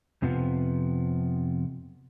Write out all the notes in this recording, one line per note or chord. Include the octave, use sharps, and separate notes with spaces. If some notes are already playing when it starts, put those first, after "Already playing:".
F2 C3 F3 B3